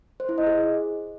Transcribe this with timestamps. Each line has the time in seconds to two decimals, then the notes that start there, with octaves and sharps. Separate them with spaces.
0.20 C5
0.29 E4
0.38 D#5
0.47 G#4